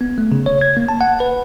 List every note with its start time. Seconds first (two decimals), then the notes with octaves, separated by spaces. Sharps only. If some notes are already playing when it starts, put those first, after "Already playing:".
0.01 B3
0.18 A3
0.32 C#3
0.46 C#5
0.61 G#6
0.77 A#3
0.89 A5
1.01 F#5
1.20 B4